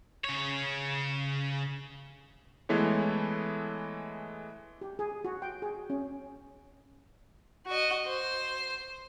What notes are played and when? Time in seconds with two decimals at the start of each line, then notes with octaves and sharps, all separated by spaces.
0.24 C#3 C#5
2.69 E3 G#3 A3 B3 E4 C#5
4.81 G4
4.99 G#4
5.25 F#4
5.42 G5
5.62 G#4
5.90 C#4
7.66 F#4 D#5
8.06 C5